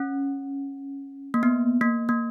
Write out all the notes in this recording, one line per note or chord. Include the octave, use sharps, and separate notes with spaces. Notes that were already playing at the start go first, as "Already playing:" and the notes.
Already playing: C#4
A#3
B3
A#3
A#3